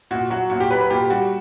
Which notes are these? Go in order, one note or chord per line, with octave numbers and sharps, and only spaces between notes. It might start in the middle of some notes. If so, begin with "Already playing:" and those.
A#2 F#4
F#3 F#4
A#2 F#4
G4
F#3 B4
B4
A#2 G4
G3 F#4